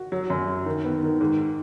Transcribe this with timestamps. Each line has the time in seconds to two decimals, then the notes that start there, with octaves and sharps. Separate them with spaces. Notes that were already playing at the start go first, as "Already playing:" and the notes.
Already playing: F#4
0.12 F#3
0.30 F#2
0.48 F#3
0.66 D#3
0.85 B3
1.03 D#3
1.21 G#2